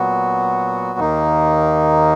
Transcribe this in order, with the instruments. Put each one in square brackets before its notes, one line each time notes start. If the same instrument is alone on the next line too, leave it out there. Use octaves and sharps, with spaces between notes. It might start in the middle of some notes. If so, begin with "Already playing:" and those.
Already playing: [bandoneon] A#2 F#3 B3 F#4
D#2 D#3 A#3 D#4